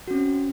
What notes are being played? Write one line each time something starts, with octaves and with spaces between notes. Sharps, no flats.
C4 C#4 F#4